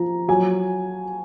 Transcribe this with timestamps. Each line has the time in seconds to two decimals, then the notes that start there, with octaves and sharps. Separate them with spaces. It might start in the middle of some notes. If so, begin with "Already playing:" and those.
Already playing: F3 A#5
0.28 F#3 G#5